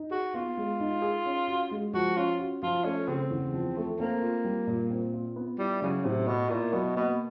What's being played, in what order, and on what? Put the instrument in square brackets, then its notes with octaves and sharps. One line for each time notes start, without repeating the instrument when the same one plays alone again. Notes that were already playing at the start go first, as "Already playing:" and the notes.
Already playing: [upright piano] D#4
[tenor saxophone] F#4 [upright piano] G#4
[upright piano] B3 [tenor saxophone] F4
[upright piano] G#3
D#4
G#4
C#4
F#4
G#3
[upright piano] F3 [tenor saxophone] F#4
[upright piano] C#4 [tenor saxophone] F4
[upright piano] F#4
[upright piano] F3 [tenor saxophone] F4
[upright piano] A3 [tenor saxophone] C#4
[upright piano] C#3 [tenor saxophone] C4
[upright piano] E2
F3
A3
[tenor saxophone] A#3 [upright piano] C4
[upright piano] F4
G3
A#2
C4
F4
B3
[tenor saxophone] G3 [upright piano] E4
[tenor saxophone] C#3 [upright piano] F#3
[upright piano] A2 [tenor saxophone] C3
[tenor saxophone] B2 [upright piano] B3
[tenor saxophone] A#2 [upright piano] E4
[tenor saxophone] B2 [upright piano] F#3
[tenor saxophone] B2 [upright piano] A#3